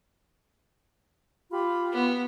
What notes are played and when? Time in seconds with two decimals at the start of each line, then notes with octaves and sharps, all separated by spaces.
1.50 F4 G4 B5
1.93 B3